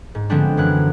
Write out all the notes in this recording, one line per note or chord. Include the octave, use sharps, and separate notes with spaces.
G#2
D3 F3 G#3 B3 C4 D4
F#2 E3 F#6